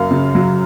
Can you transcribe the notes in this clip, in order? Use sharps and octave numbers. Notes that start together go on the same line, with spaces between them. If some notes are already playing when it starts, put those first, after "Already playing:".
Already playing: F#2 C#3 F#3 A#3 F5
C#3
F#3